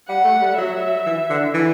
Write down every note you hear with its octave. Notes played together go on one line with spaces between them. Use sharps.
G3 F#5
A3
G3
F#3 E5
E3
D3
E3